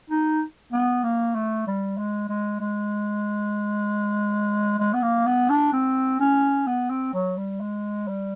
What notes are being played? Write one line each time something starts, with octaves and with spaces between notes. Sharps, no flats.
D#4
B3
A#3
A3
G3
G#3
G#3
G#3
G#3
B3
A#3
B3
D4
C4
C#4
B3
C4
F#3
G3
G#3
G3